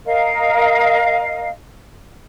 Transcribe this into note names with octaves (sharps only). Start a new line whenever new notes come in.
A#4 D#5 F5